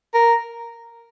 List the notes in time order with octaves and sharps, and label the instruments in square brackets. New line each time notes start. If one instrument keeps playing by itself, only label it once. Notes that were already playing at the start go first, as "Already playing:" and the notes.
[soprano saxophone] A#4